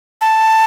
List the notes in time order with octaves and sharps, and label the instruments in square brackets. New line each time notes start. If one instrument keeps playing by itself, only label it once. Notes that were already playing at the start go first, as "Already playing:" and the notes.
[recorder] A5